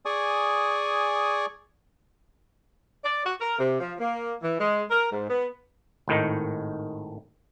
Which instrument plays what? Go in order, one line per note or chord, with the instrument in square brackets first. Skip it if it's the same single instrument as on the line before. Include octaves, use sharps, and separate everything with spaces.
[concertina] G#4 D5 G#5 C#6 D#6
[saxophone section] D5
F#4
A#4
C3
F3
A#3
E3
G#3
A#4
G#2
B3
[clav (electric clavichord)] G#1 A2 D#3 D#4